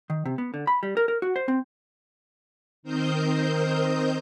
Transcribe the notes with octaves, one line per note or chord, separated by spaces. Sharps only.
D#3
C3
B3
D3
B5
G3
A#4
A#4
F#4
C5
C4
D#3 C4 A#4 C5 D#5 G6